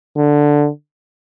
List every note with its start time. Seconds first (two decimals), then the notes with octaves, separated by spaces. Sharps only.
0.17 D3